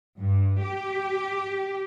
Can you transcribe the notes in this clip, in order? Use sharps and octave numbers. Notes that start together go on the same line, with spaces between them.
G2
G4